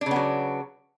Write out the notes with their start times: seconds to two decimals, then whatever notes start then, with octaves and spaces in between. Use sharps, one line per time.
0.01 D4
0.06 C#3
0.11 B3
0.16 F#3